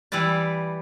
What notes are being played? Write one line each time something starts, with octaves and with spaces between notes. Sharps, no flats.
E3 G3 E4 B4 D5